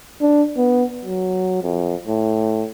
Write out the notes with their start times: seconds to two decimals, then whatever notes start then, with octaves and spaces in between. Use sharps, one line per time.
0.21 D4
0.57 B3
1.05 F#3
1.63 F2
2.07 A2